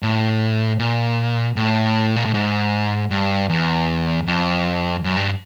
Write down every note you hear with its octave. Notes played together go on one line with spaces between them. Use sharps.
A2
A#2
A2
A#2
A2
G#2
G2
E2
F2
F#2
G2